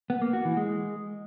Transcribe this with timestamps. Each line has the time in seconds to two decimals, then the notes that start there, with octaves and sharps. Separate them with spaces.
0.10 B3
0.22 A#3
0.33 F#4
0.45 E3
0.57 G#3